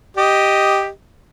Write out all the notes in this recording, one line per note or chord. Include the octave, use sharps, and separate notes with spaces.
G4 D#5